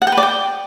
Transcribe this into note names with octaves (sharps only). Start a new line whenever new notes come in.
F#5
G5
B4
D5
G5